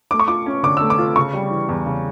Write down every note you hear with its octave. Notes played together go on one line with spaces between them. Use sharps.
A3 D6
C#6
F4 D6
C#4
D3 D6
A3 E6
D6
F4
C#3 C#6
G3
E3
E2
C#3